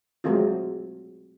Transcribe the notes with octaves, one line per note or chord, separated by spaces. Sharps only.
F#3 G#3 A3 C4 F4